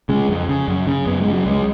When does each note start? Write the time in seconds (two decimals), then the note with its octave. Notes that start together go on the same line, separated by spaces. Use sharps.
0.09 C#3 G#3
0.29 F2
0.49 C#3
0.68 F#2
0.87 C#3
1.06 F#2 B3
1.21 G#3
1.27 C#3
1.33 F#3
1.45 C#2 G#3